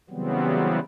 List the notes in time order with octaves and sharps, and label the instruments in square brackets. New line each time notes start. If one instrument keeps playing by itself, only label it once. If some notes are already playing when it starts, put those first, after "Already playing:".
[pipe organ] C#3 E3 F#3 G3 B3 C4